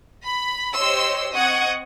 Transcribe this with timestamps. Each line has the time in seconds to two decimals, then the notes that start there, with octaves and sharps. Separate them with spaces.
0.25 B5
0.76 G4 C5 C#5 D#5 C6 E6
1.33 C4 D#5 F#5 C#6 D#6 G#6